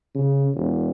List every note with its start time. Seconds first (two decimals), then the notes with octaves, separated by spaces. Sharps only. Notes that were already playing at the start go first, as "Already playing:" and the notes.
0.15 C#3
0.54 E1